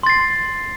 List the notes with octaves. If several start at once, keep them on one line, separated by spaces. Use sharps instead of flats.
C6 A6 C7